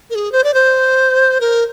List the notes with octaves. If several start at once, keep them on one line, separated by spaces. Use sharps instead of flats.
A#4
G#4
C5
D5
C5
A#4